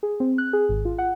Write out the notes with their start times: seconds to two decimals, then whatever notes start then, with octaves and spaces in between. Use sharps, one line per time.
0.03 G#4
0.20 C4
0.38 F#6
0.53 G#4
0.69 G#1
0.85 F4
0.98 F#5